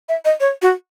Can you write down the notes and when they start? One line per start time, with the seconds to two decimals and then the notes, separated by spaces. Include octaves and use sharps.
0.09 E5
0.25 D#5
0.40 C#5
0.62 F#4